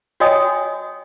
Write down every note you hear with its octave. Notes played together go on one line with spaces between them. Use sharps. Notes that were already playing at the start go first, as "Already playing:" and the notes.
F#4 C#5 D#5 G5 G#5 D#6